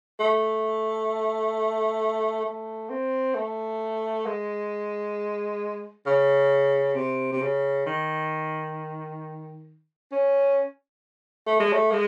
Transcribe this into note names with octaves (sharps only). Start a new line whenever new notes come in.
A3
A3
C4
A3
G#3
C#3
C3
C3
C#3
D#3
C#4
A3
G#3
A3
G#3